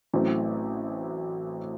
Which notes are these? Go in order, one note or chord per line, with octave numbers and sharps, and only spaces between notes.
A1 A2 F#3 A3 C4